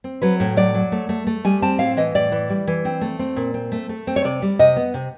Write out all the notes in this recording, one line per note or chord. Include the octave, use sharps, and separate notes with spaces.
C4
F#3 B4
A2
F#3 D5
F#3
A3
A3
A3
G3 G#5
C4 A5
A2 F5
E3 D#5
A2 D5
E3
G3
E3
C4
A3
C4
A#2
C4
A3
A3
C4
C#5
C3 D5
G3
C3 D#5
B3
C3